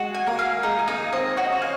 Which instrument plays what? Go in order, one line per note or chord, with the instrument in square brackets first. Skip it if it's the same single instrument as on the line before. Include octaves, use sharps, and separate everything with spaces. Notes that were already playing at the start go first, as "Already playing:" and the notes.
Already playing: [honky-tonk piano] G#3 G#4 [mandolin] F#4
[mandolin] G#5
[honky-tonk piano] A#3 A#4
[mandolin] F5
[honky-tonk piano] G#3 G#4 [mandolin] D#4
[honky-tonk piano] G#4
[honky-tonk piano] A#3 A#4 [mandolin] D#4
[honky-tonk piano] C4 C5 [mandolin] D#5
[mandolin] F#4 [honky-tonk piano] C#5
[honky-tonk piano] D#5
C#4 C#5
[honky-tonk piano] F5 [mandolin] G#5